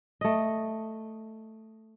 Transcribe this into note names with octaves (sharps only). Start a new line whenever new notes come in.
A3 D#5